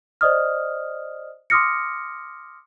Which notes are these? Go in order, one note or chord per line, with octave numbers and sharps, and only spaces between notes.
C5 D5 D#5 D#6 F6
C6 D6 D#6 F6 A#6 C#7